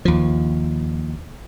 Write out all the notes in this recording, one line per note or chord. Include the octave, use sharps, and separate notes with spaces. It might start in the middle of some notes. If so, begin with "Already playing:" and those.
D#2 F3